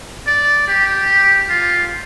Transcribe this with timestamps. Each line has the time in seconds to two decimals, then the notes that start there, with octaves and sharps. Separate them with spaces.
0.27 D5
0.68 G4
1.49 F4